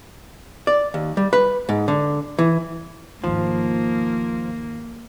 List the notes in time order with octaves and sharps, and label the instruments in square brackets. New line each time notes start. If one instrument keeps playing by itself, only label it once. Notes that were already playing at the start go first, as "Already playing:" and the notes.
[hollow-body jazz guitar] D5
D#2
G3
B4
G#2
D3
E3
[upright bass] G#1 D#2 [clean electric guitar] F3 [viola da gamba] A#3